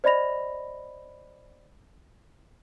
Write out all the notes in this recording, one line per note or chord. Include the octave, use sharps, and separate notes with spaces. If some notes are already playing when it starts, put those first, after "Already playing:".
C5 D5 D#5 B5 A#6 F7